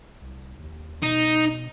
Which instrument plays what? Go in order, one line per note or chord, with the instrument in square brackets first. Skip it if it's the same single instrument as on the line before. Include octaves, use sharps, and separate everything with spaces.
[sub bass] C2
D#2
[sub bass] B2 [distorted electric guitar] D#4